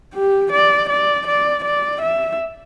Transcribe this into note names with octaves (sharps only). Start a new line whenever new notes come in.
G4
D5
D5
D5
D5
E5